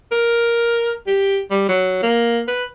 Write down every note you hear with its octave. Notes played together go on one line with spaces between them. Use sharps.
A#4
G4
G3
F#3
A#3
B4